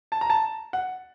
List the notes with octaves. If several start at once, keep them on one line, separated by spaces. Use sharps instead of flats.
A5
A#5
A5
F#5